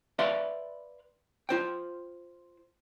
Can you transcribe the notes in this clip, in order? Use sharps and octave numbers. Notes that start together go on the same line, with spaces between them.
B4 D5 E5 F5 C6
F4 C5 G5